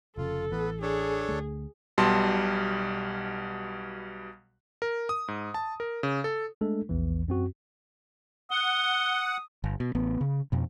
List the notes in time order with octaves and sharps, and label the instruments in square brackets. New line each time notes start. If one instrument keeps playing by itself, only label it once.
[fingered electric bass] F1 C#3 [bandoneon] F4 [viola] A4
[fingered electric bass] A1 E3 [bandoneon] B3 B4
[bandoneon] D4 A4 C#5 [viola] G#4
[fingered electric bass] D2 A3
[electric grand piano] B1 B2 G3 A5 C6
A#4
D#6
G#2
A5
A#4
C#3
A4
[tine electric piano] G#3 A3 D4 A4
A#1 E2 E3
F#2 C4 F#4
[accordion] F#5 [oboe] D#6 [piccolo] G7
[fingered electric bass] G1
B2
A1 B3
C#3
F2 B2